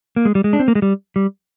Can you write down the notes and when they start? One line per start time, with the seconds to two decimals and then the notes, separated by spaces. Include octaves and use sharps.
0.16 A#3
0.25 G#3
0.35 G3
0.44 G#3
0.53 D4
0.59 C4
0.68 A#3
0.75 G#3
0.82 G3
1.16 G3